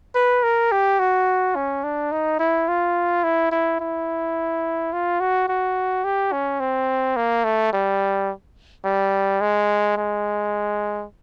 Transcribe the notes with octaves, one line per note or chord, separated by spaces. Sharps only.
B4
A#4
G4
F#4
C#4
D4
D#4
E4
F4
E4
E4
E4
F4
F#4
F#4
G4
C#4
C4
A#3
A3
G3
G3
G#3
G#3